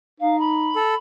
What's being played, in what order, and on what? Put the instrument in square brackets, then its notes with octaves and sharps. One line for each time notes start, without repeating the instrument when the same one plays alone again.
[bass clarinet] D#4 [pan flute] F5
[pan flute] B5
[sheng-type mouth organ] A4